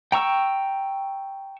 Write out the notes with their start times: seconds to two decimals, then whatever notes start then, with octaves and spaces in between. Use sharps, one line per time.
0.12 G5 A#5 C#6 E6